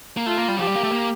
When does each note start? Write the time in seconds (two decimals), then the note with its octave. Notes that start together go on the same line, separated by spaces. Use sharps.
0.17 A#3
0.26 A3 F4
0.38 A#3
0.48 G3
0.59 F3 G4
0.67 G3
0.76 A#3
0.84 A3
0.91 A#3